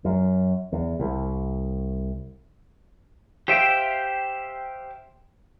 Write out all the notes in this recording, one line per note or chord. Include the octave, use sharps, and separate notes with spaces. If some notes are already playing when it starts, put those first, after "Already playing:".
F#2
E2
C2
G4 C5 E5 F5 G5